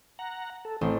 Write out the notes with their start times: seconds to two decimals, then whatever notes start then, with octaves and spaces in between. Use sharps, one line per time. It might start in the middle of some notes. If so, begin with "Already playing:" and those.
0.19 F#5 A#5
0.65 A4
0.81 A1 A3 C4 C5